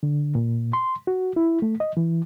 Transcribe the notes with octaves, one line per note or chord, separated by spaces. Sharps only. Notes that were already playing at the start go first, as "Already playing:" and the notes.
D3
A#2
C6
F#4
E4
A3
D#5
E3